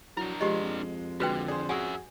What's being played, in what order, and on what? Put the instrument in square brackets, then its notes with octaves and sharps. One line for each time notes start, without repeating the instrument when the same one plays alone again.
[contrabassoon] F#3 [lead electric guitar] D4 A#4 [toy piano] E4
[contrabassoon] F3 [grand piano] G#3 [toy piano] G4 D#5
[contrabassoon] F2
[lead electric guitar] D3 [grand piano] G#3 F#6 [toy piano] F#4 B4 G5
[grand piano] G#4 C5 [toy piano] D5
[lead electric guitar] C#4 E5 [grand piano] F#4 G#4 [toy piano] G#5